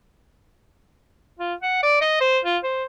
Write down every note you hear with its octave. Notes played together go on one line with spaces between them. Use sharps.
F4
F#5
D5
D#5
C5
F4
C5